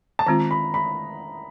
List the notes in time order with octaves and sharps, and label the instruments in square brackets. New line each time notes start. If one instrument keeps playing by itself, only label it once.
[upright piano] A5
[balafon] D#3 G#3 C4 F4 [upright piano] A#5
[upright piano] B5
B5